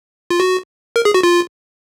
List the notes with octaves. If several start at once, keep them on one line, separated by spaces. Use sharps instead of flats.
F4
F#4
A#4
G#4
F#4
F4